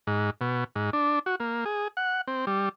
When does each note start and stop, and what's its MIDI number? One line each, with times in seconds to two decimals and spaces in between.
0.07 0.30 44
0.41 0.64 47
0.76 0.90 44
0.93 1.19 62
1.26 1.35 66
1.40 1.65 58
1.65 1.88 68
1.97 2.21 78
2.28 2.45 60
2.47 2.69 55